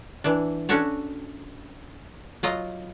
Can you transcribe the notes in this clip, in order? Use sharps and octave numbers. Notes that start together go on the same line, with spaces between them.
E3 D4
C#4 D4 F#4 A4 C#5
F#3 F4 D#5